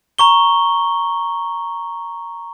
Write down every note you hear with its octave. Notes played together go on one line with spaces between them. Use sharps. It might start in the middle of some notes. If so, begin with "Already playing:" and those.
A#5 C#6 G7